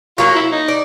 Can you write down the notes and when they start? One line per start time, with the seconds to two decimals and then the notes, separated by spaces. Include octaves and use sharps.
0.18 F#3 A#3 C#4 F4
0.35 E4
0.52 D#4
0.68 D5